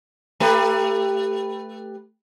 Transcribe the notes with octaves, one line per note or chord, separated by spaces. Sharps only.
A3 G4 B4